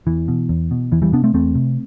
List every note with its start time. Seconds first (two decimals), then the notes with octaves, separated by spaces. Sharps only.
0.07 E2 E3
0.28 B2
0.49 E2
0.71 B2
0.92 E2 E3
1.02 E3 G3
1.13 C3 B3 D4
1.24 A3 C4
1.34 E2 A3 C4
1.55 C3